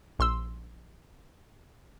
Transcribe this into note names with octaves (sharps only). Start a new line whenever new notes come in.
A#1 C6 E6